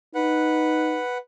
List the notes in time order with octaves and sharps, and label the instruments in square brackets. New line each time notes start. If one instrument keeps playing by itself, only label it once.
[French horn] D#4 [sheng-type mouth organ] B4 F#5